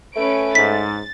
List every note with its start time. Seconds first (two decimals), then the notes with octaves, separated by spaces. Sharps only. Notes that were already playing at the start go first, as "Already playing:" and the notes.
0.16 A3 C#4 B4 D7
0.55 G#2 A6 B6